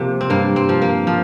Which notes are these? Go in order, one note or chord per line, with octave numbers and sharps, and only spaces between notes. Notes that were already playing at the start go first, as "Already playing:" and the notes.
Already playing: C3 F3 A#3
C4
G2 A#3
C4
F3
A#3
F3